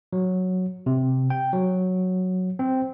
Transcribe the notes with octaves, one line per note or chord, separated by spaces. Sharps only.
F#3
C3
G5
F#3
C4